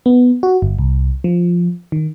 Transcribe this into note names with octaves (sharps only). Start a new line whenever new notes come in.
B3
F#4
G1
C2
F3
D#3